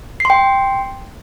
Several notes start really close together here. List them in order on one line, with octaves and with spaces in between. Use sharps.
C7 C6 G5